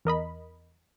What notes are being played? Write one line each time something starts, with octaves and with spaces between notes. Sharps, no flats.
E2 A#4 D#5 B5